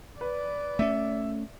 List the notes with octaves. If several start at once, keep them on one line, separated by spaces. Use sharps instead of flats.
B4 D5
A3 C#4 E5